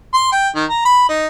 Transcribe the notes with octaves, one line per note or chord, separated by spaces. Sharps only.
C6
G5
D#3
A#5
B5
D#4